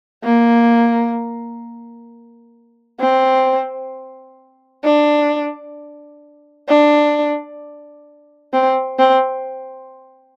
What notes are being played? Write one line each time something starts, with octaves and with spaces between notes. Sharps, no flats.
A#3
C4
D4
D4
C4
C4